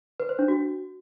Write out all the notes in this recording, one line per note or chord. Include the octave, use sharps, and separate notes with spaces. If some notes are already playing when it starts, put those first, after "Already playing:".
B4
C5
D4
F#4